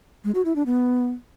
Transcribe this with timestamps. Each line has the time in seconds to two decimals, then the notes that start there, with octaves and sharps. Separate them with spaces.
0.24 G#3
0.35 F#4
0.45 E4
0.56 D4
0.66 B3